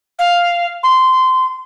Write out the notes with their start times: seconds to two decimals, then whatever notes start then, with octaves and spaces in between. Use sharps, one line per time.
0.19 F5
0.83 C6